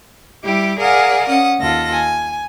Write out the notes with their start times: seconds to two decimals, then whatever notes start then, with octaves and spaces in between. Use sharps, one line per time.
0.44 G3 E4 G4 D6
0.78 G#4 A#4 D5 F5 F#5 G#5
1.28 C#4 F#5 D#6
1.60 D#2 F4 A4 A#6
1.91 G#5